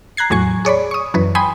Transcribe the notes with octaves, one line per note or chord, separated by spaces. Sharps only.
A#5 F#6 G#6 C7
E2 A2 F#3 G#5 C#6
G#4 C#5 D5 B5
C#6 D#6
F#2 E3 B4
G5 G#5 B5 C6 D#6